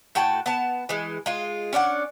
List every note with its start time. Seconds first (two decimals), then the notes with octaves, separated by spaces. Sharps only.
0.15 A2 F#4 G5 A5
0.46 B3 A5
0.89 E3 G#3
1.26 G#3 F4
1.73 C#4 D4 D5 F#5